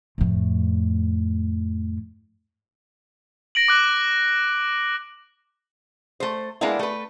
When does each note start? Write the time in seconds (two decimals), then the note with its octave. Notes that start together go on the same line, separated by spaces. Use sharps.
0.18 F2 A2
3.55 A#6 D7 F#7
3.68 D6 F#6
6.20 A3 C5
6.61 G#3 A#3 B3 D4 E4
6.79 A3 B4